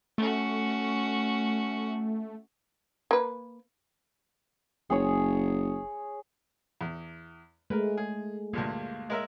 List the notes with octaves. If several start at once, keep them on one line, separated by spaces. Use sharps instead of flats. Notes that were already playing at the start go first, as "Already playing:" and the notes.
A3 C#4 F#4
A#3 B4
F#1 G#4 C#5
E2
G#3 A3 A#4 B4
G#4
D2 G2 A#2 A#3
G#3 A#4 E5